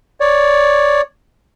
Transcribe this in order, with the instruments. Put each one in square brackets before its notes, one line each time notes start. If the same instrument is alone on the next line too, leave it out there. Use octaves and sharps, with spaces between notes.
[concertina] C#5 D5